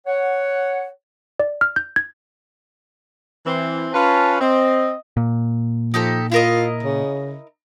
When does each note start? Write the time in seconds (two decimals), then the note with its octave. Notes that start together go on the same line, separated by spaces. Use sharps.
0.06 C#5 F#5
1.40 D5
1.61 F6
1.76 G6
1.96 G#6
3.46 E3 C4
3.94 C#4 F4 B4 A5
4.41 C4 D#5
5.17 A#2
5.94 F3 D#4 G4 A4
6.32 E4 F4 A#4 D#5
6.83 C#3